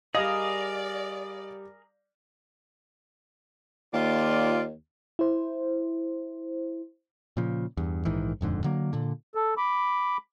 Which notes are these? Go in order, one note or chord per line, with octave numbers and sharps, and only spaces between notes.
G3 G#4 A#4 D5 D#5 F5 D#6 A#6
D#2 F4 D5
E4 C5
A#2 C#3 F3
E2 G2
A#1 G#2 D#3 E3
D#1 F2 G#2 D3
D3 F#3 A#3
A#2 D3
A4
B5 D6